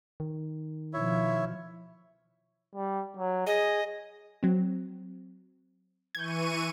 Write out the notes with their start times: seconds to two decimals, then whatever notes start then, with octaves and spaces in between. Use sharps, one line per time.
0.20 D#3
0.93 B2 F3 E4 C#5 E5
2.75 G3
3.17 F#3
3.47 G#4 D#5
4.43 F#3 C4
6.15 E3 C#6 G6 G#6 D#7